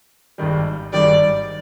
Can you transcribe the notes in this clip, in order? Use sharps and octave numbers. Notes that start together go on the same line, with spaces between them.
G#1 G2 D#3 G3
G#1 G2 D#3 G3 D5